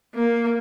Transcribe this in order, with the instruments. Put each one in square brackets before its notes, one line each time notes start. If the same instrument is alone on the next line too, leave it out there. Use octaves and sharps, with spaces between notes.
[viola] A#3